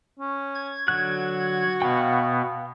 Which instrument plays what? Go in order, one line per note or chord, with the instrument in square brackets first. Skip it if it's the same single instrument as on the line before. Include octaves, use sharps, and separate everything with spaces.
[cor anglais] C#4
[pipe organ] G#6
[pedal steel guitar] D3 F#3 F#6 [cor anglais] F#4
[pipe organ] B2 B3 [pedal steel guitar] F5 G5